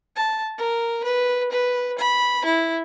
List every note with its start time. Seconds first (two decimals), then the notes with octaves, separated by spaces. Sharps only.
0.16 A5
0.58 A#4
1.04 B4
1.51 B4
1.98 B5
2.45 E4